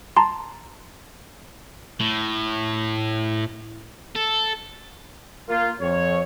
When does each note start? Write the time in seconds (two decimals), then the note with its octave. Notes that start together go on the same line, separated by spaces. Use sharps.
0.17 A5 A#5 C6
2.00 A2
4.15 A4
5.49 A#3 F4
5.81 F2 C#5